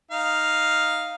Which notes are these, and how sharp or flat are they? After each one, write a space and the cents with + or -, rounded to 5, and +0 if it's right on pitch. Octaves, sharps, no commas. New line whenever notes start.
D#4 +0 F5 +0